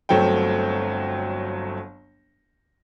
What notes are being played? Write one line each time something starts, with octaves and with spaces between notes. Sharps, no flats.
G1 F#3 A3 C4 G5